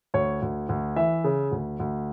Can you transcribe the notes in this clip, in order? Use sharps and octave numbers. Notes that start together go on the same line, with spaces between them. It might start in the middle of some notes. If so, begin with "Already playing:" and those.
D2 C#5
D2
D2
E3 E5
C#3
D2
D2